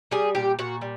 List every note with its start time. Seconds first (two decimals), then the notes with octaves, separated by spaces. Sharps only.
0.11 G3 G#4
0.35 A#2 G4
0.59 A#2 F#4
0.81 G3